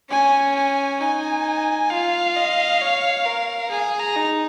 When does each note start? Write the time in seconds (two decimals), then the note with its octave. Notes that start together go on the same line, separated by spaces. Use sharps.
0.11 C#4 G#5
0.55 G#5
1.00 D#4 G#5
1.90 F4 F5
2.36 D#5
2.81 C#5
3.25 A#4
3.71 G#4 G#5
4.00 A#5
4.16 D#4